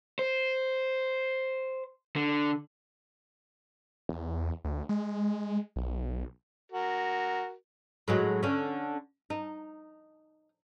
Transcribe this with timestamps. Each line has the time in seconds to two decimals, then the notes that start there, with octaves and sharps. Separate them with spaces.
0.19 C5
2.16 D3
4.09 E2
4.65 D2
4.89 G#3
5.76 B1
6.72 F#4 A#4
8.08 A2 F#3 G#3
8.43 D3 C#4
9.30 D#4